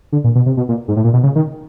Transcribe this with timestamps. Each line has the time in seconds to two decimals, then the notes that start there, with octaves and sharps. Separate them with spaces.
0.12 D3
0.24 A#2
0.35 B2
0.46 C3
0.57 B2
0.69 A#2
0.88 G#2
0.96 A2
1.04 A#2
1.13 B2
1.23 C#3
1.36 D#3